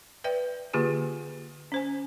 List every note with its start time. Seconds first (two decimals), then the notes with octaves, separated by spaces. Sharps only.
0.24 B4 D5 E5 G5
0.73 D3 A#3 F4 G4 G#4 G#5
1.72 C#4 C5 G#5